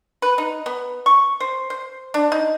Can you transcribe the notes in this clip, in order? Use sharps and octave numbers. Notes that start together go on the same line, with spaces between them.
B4
D#4
B3
C#6
C5
C5
D4
D#4